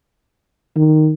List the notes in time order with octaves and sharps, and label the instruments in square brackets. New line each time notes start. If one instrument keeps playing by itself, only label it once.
[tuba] D#3